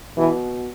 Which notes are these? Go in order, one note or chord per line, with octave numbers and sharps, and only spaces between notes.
B2 E3